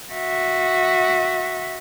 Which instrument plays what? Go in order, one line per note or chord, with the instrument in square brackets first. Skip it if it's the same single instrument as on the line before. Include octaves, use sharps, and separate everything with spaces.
[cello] F#4 E5